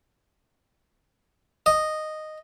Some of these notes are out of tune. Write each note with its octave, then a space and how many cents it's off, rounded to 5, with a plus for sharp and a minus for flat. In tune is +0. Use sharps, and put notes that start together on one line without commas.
D#5 -5